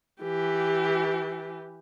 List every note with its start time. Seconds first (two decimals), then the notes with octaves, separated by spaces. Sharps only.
0.21 E3 G4